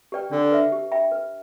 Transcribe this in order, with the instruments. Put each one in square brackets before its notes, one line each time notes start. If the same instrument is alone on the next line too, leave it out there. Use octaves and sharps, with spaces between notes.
[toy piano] G4 B4 D5 G5
[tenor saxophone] D3 [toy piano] D4
[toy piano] B4 E5
G4
E5 G5 B5
B4